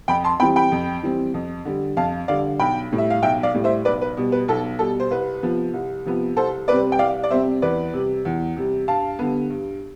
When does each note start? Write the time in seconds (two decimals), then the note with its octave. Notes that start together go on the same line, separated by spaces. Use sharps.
0.08 F2 G5 B5
0.24 A5 C6
0.40 E3 G3 C4 G5 B5
0.56 G5 B5
0.72 F2
1.03 E3 G3 C4
1.34 F2
1.65 D3 G3
1.97 F2 F5 A5
2.28 D3 G3 D5 F5
2.60 B1 G5 B5
2.91 A2 G3
2.98 E5
3.10 F5
3.22 B1 E5 G5
3.43 D5 F5
3.53 A2 G3
3.64 C5 E5
3.85 B1 B4 D5
4.02 B4
4.17 B2 G3
4.32 B4
4.48 B1 A4
4.79 B2 G3 A4
5.00 C5
5.11 C2 B4
5.43 C3 F3 B3
5.74 C2
6.05 C3 F3 B3
6.37 C2 A4 C5
6.68 C3 G3 C4 B4 D5
6.92 G5
6.99 C2 D5 F5
7.24 D5
7.30 C3 G3 C4 C5 E5
7.62 E2 B4 D5
7.93 C3 G3
8.25 E2
8.57 C3 G3
8.88 G2 F5 A5
9.19 D3 G3 B3
9.50 G2